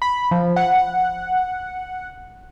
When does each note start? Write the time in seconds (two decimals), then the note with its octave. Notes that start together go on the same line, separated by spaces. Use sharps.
0.02 B5
0.31 F3
0.56 F#5